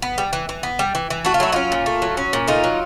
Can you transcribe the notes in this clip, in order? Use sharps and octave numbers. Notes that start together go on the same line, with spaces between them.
B3
G3
E3
E3
B3
G3
E3
E3
A3 F#4
F4
F#3 E4
C#4 D#4 F4
A#2
A3
F#3
C#4
A#2
A3 D#4 F4
F#3